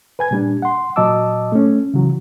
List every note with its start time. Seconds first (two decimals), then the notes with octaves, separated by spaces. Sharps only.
0.19 B4 G#5 G#6
0.31 A#2 G3 D4
0.62 F#5 C6
0.96 A#2 F#3 D#5 A5 D6 E6
1.52 A3 C#4
1.94 C#3 E3 F#3